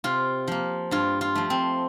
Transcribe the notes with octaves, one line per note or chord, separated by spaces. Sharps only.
C3 F4
F3 A#3
G2 F4
F4
F3 A3
C4